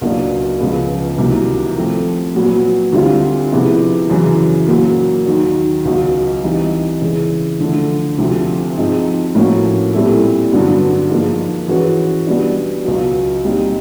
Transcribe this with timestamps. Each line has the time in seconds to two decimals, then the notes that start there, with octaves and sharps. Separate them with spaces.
0.01 C#2 B2 F#3 A#3 D4
0.60 C#2 C#3 F3 G#3 B3
1.18 C2 C3 D#3 F#3 A#3
1.76 F3 A3 C4
2.35 A#2 F#3 B3
2.92 D2 D3 G3 C4 F4
3.51 C3 F3 G#3 B3 E4
4.10 F#2 C#3 E3
4.68 A#2 F#3 A#3
5.26 D#2 D#3 F#3
5.85 C#2 B2 F#3
6.43 E3 G3 C4 D#4
7.02 C#3 E3 G#3
7.60 D3 F3 A3
8.18 D2 C3 F3 A3 C4
8.77 G#2 F3 G#3 C4 D#4
9.35 A2 F3 A#3 C#4 F#4
9.93 A#2 G3 C4 E4 A4
10.52 G2 D3 F#3 B3 D4
11.10 G#2 F3 A#3
11.68 E3 G#3 C#4 F#4 B4
12.27 B2 G3 B3 D4
12.85 C#2 B2 F#3
13.44 A#2 G3 C4 D#4